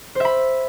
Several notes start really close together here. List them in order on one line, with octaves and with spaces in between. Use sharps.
C5 E5 B5